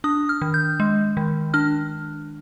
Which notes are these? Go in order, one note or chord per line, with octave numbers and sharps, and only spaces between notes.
D4 D#6
F6
D#3
G6
G#3
D#3
D4 F6